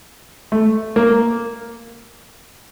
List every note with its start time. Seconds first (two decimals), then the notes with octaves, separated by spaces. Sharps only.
0.52 A3
0.96 A#3